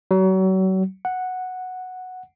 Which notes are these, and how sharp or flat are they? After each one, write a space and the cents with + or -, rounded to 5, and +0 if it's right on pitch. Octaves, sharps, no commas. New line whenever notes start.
F#3 +35
F#5 -5